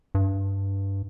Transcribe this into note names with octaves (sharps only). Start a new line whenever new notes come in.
G2